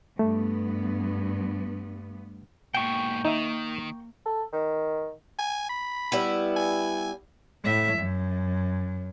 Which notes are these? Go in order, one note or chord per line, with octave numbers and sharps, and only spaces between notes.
G2 A3 B3
G#2 B2 A#3 G5 C#6
D#3 D#4 E5
A4
D#3
G#5
B5
G3 B3 E4
G#5
A2 E5
F#2